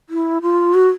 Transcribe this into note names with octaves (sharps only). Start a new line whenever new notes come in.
E4
F4
F#4